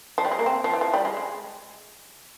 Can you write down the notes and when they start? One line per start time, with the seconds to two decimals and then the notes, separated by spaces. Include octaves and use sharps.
0.18 F3
0.25 G3
0.32 G#3
0.39 A#3
0.46 C4
0.64 F3
0.74 E3
0.81 F3
0.94 G3
1.05 G#3
1.17 G#3